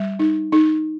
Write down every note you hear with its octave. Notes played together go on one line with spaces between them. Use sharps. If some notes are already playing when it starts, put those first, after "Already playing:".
Already playing: G3
D#4
D#4